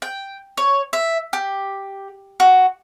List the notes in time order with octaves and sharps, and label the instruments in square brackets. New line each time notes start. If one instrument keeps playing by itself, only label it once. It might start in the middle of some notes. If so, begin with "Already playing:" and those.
[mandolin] G5
C#5
E5
G4
F#4